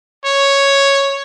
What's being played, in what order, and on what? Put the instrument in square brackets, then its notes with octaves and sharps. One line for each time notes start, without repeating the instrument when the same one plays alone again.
[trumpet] C#5